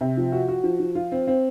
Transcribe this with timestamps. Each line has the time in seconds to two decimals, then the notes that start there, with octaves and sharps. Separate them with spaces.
0.01 C3
0.17 F3
0.32 F#4
0.48 F#4
0.64 F3
0.80 F3
0.95 F4
1.12 C4
1.27 C4